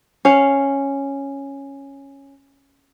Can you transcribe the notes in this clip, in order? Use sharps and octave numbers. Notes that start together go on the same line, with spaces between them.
C#4 F5